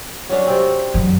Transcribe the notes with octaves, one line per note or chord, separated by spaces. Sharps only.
F#3 C#4 D4
C3 C4
F#2 C#3